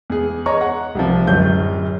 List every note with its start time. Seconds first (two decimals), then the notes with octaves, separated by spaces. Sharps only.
0.10 E2 G#4
0.46 C#5 D#5 A#5 C#6
0.61 F#5
0.95 C2 C3 F3
1.27 D1 F#2 F#3 G6